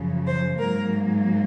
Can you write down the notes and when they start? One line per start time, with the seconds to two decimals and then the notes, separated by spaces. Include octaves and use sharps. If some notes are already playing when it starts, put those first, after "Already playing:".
Already playing: F#2 C#3 F3
0.26 C5
0.58 G#2 F#3 A#3 A#4